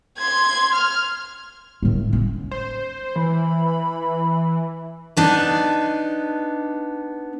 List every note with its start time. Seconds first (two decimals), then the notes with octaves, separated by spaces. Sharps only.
0.18 C6 G#6
0.74 F6
1.82 A2 D#3
2.13 C#4
2.51 C5
3.16 E3 B5
5.17 B3 D4 D#4